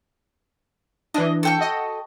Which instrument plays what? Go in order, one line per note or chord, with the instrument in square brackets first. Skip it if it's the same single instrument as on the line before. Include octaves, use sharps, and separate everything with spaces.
[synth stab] E3 D4 [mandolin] D#5
[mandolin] A4 G5 C#6
[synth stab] F#4 D#5